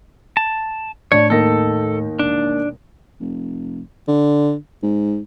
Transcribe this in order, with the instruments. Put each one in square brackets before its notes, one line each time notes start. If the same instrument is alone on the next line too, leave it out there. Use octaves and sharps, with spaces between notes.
[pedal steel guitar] A5
[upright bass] A2 [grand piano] D4 D5 [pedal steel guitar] C#5
[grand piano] D#2 D#3 A#6 [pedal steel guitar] A4
[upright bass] E1 [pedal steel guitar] D4
[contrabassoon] F1
D3
G#2